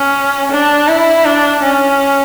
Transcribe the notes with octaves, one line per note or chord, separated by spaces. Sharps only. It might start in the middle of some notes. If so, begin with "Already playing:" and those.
Already playing: C#4
D4
E4
D4
C#4